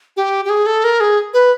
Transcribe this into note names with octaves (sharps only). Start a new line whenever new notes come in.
G4
G4
G#4
A4
A#4
G#4
B4